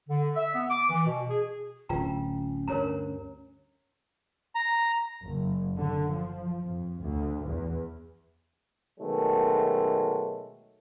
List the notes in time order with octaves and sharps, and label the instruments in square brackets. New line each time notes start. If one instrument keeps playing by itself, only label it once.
[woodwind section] D3
E5
B3
D6
E3
B2
G#4
[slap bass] D1 [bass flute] C#4 [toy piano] F4 G5 A#5
[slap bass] D2 G2 [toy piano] A#4 C#5 A#5
[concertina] A#5
[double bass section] F#1
D3
F3
F2
D2
E2
[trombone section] B2 D#3 F#3 G#3 A3